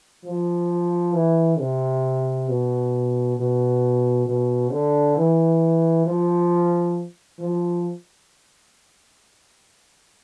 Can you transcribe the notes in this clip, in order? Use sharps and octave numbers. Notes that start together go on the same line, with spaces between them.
F3
E3
C3
B2
B2
B2
D3
E3
F3
F3